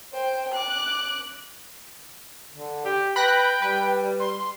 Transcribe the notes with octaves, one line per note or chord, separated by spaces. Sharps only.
C5 G5
D6 F#6
D3
G4
B4 G5 B5 F#6 A#6
G3 B4
C6